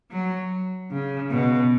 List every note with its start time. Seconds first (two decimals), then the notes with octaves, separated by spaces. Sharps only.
0.11 F#3
0.91 C#3
1.30 B2